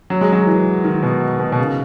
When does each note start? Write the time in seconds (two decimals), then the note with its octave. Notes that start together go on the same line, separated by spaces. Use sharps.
0.10 F#3
0.21 G#3
0.32 F#3
0.47 E3
0.84 D#3
1.03 B2
1.40 B2
1.52 B2
1.58 C#3